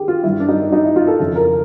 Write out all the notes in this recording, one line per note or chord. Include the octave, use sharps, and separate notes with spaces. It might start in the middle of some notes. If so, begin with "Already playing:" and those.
Already playing: D#3 G4 G#4
F4
G2 E3 G3 E4
D4
D#4
D#4
E4
F4
A4
F2 C#3 E3
A#4